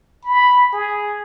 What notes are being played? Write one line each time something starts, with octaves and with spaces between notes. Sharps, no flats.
B5
G#4